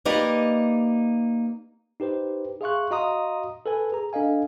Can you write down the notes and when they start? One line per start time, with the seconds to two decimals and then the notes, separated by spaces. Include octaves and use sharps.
0.05 A#3 D#4 G4 B4 D5 D#5
2.00 D#4 G4 B4 C5
2.61 G#4 E5 F5 C6 C#6 F#6
2.91 F#4 D#5 F5 A#5 C6 D#6
3.66 A4 B4 G#5
3.92 G#4 A#5
4.13 D4 A4 D#5 F5 G#5